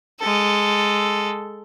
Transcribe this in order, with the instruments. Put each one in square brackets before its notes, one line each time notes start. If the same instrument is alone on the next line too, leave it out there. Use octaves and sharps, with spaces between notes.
[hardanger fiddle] G#3 A4